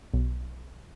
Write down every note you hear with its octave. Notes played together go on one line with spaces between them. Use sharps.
B1